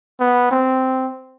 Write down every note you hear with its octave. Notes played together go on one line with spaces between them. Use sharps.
B3
C4